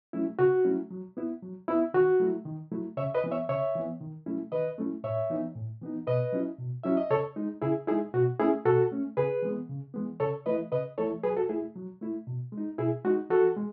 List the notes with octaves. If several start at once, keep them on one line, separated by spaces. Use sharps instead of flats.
F#3 A3 C#4 E4
C#3 F#4
F#3 A3 C#4 E4
F#3
B3 E4
F#3
B3 E4
D#3 F#4
F#3 A3 E4
D#3
F#3 A3 E4
C#3 C#5 E5
B4 D#5
E3 B3
C#5 E5
C#3 C#5 E5
E3 B3
D#3
F#3 A3 C#4 E4
D#3 B4 D#5
F#3 A3 C#4 E4
A2 C#5 E5
E3 B3 D#4
A2
E3 B3 D#4
B2 B4 D#5
F#3 C#4 E4
B2
F#3 C#4 E4 E5
D#5
C#3 A4 C#5
G#3 D#4
C#3 E4 G#4
G#3 D#4 E4 G#4
B2 F#4
A3 C#4 E4 G#4
B2 F#4 A4
A3 C#4
C#3 G#4 B4
E3 G#3 B3
C#3
E3 G#3 B3
C#3 A4 C#5
E3 A3 E4 B4 D#5
C#3 B4 D#5
E3 A3 E4 A4 C#5
F#3 G#4 B4
F#4 A4
A3 E4 G#4
F#3
A3 E4
B2
G#3
D#4
B2 E4 G#4
G#3 D#4 F#4
E3 F#4 A4
G#3